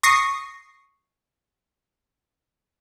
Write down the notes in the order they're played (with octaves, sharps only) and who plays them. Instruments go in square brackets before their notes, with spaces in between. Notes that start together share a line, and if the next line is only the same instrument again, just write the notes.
[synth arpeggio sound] C#6 D#6 A#6 C7